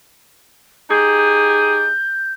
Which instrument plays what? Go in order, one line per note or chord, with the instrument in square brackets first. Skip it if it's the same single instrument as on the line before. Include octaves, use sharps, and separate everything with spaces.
[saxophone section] D#4 G4 G#4 [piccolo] G6